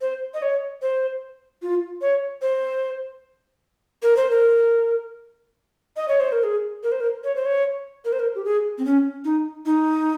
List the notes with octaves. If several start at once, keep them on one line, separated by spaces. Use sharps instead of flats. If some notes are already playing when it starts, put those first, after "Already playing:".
C5
D#5
C#5
C5
F4
C#5
C5
A#4
C5
A#4
D#5
C#5
C5
A#4
G#4
A#4
C5
A#4
C#5
C5
C#5
A#4
C5
A#4
G4
G#4
C4
C#4
D#4
D#4